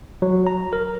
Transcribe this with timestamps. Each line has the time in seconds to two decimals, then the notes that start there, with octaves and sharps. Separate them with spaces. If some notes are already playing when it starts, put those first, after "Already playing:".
0.22 F#3
0.47 A#5
0.73 A#4